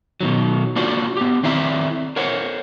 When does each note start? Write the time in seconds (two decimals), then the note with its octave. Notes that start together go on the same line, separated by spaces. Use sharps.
0.21 B2 D#3 F#3
0.76 A#3 D4 F4 F#4 C5 D5
1.17 B3 G4
1.43 D#3 C4 E4 D5 E5 A#5
2.16 A#4 C5 C#5 F#5